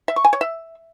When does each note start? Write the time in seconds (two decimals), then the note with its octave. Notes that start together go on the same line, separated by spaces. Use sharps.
0.08 E5
0.16 C#6
0.25 G#5
0.33 C#5
0.41 E5